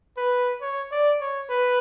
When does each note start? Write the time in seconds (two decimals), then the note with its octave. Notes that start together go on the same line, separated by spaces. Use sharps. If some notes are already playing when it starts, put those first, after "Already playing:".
0.17 B4
0.61 C#5
0.91 D5
1.20 C#5
1.50 B4